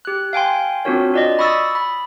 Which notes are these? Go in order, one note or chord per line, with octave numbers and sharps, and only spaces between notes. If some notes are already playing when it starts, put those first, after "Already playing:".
G4 F#6
F5 G5 G#5 C6
C4 D4 F4 F#4 A#4 C#5
F4 D5 D#5
B5 C#6 D#6 E6 A6
B5